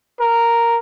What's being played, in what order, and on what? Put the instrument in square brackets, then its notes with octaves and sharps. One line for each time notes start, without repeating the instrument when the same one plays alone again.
[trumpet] A#4